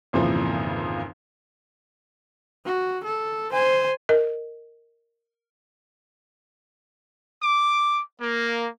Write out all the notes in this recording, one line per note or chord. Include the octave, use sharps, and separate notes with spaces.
G#1 F2 A#2 C#3 E3 F3
F#4
A4
C5 G#5
A#4 D#5
D6
A#3